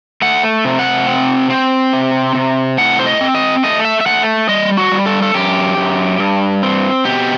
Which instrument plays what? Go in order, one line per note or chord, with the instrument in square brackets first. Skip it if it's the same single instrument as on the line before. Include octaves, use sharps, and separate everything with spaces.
[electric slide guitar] A3 F#5
C3
F#5
C4
C4
C3
C3
A2 F#5
C5
D#5
C4
D#5
A3 D#5
E5
E5
A3 F#5
G3 D#5
F#4
G3
A4
A4
F#2 G4
F#2
G2
C4
B2 G4